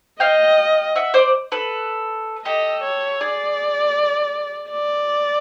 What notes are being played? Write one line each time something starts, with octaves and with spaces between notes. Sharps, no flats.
D#5 F5 G5
E5 F#5
C5 D5
A4 B4
G4 A4 D#5
C#5
G#4 D5
D5